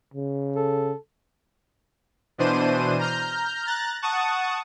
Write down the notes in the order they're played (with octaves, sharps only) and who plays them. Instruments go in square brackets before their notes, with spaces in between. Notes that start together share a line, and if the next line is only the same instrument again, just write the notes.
[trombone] C#3
[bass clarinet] A4
[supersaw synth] B2 E3 D4 C5 D#7
A#5 F6 G6
A#5 F#6 A6
F#5 A5 C#6 D#6